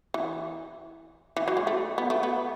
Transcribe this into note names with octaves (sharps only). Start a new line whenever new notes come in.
E3
E3
F#3
G#3
A3
B3
A3
B3